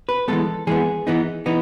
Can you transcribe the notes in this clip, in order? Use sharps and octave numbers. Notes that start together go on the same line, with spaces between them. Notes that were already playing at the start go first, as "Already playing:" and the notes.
B4
E3 G#3 B3 A4
E3 G#3 B3 G#4
E3 B3 D#4
E3 B3 D#4